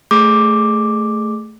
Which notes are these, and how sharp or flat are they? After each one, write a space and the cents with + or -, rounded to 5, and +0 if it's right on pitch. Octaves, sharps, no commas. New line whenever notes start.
A3 +0 G#4 +0 D6 +0